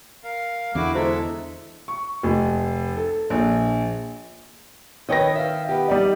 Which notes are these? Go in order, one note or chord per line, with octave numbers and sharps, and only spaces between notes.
A#4 F5
E2 D3 E4 F#4 D6
G#3 E4 A4 C5 E5
C#6
F1
A4
A#1
D#3 B4 C#5 D#5 G5 A#6
E5 F5
B3 G4
F#2 G3 D#4 D5 D#5